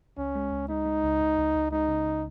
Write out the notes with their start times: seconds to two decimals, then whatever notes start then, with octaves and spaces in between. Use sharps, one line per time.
0.17 C#2 C#4
0.35 G#3
0.52 C#2
0.68 G#3 D#4
0.85 G#3
1.04 C#2
1.21 C#2
1.38 C#2
1.55 C#2
1.71 G#3 D#4
1.88 C#3
2.06 C#3